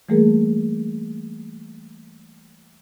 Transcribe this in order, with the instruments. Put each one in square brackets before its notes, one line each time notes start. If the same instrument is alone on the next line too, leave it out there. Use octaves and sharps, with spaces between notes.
[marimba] E3 G3 A3 A#3 G#4 A#4